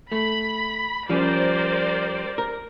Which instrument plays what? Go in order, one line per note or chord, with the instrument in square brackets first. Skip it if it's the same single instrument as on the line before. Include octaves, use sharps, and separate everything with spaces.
[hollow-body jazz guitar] A3 [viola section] B5
[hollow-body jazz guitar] F3 G3 C#4 [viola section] A#4 C5 D5
[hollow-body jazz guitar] A#4